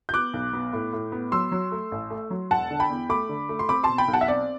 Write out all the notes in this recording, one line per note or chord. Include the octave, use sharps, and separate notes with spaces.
G6
B3 D6 F#6
B1
B3
A2
A2
B3
F#3 C6 E6
F#3
A3
A1
A3
F#3
E1 F#5 A5
D3
G5 B5
E2
A3 B5 D6
D3
A3
C6
C4 B5 D6
B2 A5 C6
G5 B5
B1
F#5 A5
E5
C4 D5